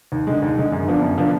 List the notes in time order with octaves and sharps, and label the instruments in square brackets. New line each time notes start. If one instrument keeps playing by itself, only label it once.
[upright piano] D#2
D3 G#3
D#2
D3 G#3
F#2
D3 F3 B3 D4
F#2
D3 F3 B3 D4